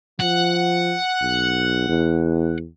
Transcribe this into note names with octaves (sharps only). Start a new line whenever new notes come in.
F3 F#5
B1
E2